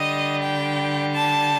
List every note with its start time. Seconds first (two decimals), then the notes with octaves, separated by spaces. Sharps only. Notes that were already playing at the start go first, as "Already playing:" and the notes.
Already playing: D3 G3 D#5
0.41 G5
1.12 A5